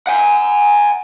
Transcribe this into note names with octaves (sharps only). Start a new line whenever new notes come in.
F#5 G#5